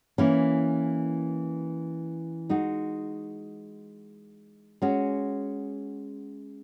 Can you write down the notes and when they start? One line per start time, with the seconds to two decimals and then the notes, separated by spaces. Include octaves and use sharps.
0.18 E3 A#3 C#4 E4
2.49 G#3 D#4 F#4
4.82 G#3 C#4 F#4